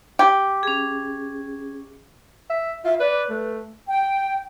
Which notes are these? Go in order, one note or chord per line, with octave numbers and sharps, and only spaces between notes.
G4
C#4 G#4
E5
F4 E5
B4 D5
A3 B4
G5